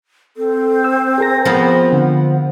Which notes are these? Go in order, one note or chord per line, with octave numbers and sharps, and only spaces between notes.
C4 A4
C5 E6
G#4 A#4 A#6
F3 B3 B5
D3 F#5